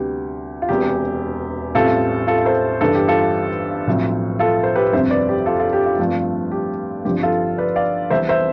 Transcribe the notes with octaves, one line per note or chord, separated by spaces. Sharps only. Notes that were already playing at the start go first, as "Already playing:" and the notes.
Already playing: D2 C3 G3 B3 G4
F4
E1 E2 C3 G4
A1 A2 G3 C4 F4 A4
F4 A4
A4 C5
G1 G2 E3 A4
G4
F4 A4
B1 A2 F3 C4
F4 A4
C5
G4 B4
G1 F2 C3 C5 E5
B4 D5
G4
F4 A4
F4 A4
G4
F4
G1 G2 F3 A3 C4 F4
G4
G1 G2 F3 C4 G4
F4 A4
B4 D5
D5 F5
C2 C3 E3 B3 C5 E5
C5 E5